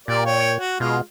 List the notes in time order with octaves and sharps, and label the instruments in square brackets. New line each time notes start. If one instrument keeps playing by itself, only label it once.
[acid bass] A#2 [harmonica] G4 A#4 D5
[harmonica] C#5 G5
F#4
[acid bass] B2 [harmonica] G#3 F4